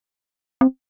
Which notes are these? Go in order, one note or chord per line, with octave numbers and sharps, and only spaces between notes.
C4